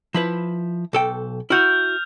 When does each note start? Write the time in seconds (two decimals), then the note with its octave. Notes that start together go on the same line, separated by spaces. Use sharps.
0.15 F3 E4 B4
0.93 B1 A4 G5
1.50 E4 F#4 F6 G6 F7